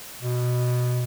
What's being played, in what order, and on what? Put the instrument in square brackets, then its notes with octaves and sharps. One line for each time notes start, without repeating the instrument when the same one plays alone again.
[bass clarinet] B2